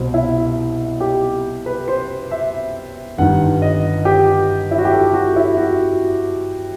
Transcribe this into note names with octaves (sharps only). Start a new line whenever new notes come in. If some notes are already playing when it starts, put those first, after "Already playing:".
Already playing: C2 B2 C5
E4
G4
B4
C5
E5
G1 G2 D#3 F#5
D#5
G4
E4
F#4
G4
A4
F#4
E4
F#4